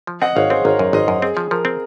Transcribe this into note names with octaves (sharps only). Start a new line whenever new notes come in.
F3
C4 D#5 F#5
G#1 C#5 F5
C4 G#4 C5
G#1 A#4 C#5
F#2
G#1 C5 D#5
F#2
C4 G#4
F3
F3 A#4
C4